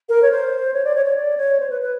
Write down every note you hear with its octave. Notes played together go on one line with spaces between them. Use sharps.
A#4
C#5
C5
C#5
D5
C#5
C#5
D5
C#5
C5
B4
B4